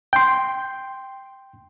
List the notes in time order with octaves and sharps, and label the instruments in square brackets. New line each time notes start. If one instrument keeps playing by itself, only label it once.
[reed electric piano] G5 C6